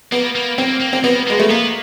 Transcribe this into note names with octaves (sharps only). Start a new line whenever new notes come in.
A#3 B3
A#3
A#3 C4
A#3
C4
A#3 B3
G#3 A#3
A3
A#3 B3